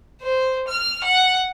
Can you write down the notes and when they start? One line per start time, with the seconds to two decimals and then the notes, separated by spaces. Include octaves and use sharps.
0.22 C5
0.68 F6
1.04 F#5